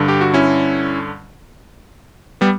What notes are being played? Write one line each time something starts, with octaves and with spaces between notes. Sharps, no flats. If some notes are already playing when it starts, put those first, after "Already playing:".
Already playing: G2 D3
G4
F#4
C#4 E4
G3 B3